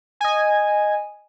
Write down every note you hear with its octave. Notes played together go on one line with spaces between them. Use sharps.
D#5 G#5